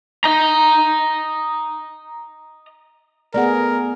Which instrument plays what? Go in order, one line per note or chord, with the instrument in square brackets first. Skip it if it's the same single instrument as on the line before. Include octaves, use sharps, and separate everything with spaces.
[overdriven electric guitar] D#5 A#5
[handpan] A3 B3 G#4 [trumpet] A#4 [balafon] D5 F#5